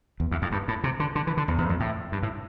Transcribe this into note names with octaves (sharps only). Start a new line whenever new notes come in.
E2
E2
F2
G2
A2
C3
D3
D3
E3
D3
E2
E2
F2
A2
G2
A2